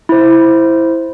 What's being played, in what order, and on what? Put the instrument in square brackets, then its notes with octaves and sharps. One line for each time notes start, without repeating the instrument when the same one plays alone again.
[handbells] E4 C5